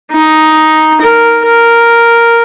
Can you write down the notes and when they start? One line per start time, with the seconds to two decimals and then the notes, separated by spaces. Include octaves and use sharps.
0.11 D#4
1.01 A#4
1.46 A#4